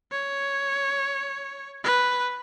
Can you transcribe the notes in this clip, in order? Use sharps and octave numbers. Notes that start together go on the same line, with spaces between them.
C#5
B4